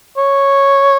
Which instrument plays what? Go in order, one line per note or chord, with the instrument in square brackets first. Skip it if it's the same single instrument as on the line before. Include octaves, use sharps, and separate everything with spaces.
[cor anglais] C#5